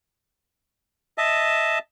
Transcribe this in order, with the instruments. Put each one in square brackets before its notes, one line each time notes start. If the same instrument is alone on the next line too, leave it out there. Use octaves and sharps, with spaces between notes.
[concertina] D#5 E5 A5